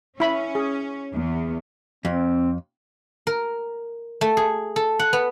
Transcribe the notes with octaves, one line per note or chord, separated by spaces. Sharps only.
C#4 E4 B5
G#4
E2
F2 C4
A#4
A3
G#4
A4
F#5
B3